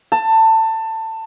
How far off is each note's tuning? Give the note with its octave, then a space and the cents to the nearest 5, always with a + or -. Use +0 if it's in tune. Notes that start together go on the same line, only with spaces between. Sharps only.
A5 +20